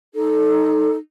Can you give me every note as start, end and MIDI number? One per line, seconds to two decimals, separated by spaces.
0.14 0.95 63
0.14 0.95 69